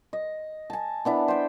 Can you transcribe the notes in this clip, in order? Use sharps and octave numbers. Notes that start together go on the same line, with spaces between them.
D#5
G#5 A5
B3 D4 E4
C5 G5